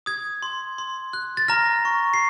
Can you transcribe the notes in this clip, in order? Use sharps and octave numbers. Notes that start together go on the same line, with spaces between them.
D#6 G#6
C6
C6
F#6
A6
A#5 F6 A#6
C#6
C7